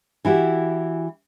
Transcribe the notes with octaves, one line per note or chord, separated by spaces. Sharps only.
E3 E4 F#4 G4